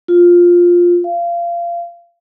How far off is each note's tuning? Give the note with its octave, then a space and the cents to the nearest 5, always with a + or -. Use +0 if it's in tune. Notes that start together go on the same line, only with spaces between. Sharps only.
F4 +5
F5 -25